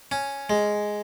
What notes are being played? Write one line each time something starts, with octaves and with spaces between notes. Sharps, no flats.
C#4
G#3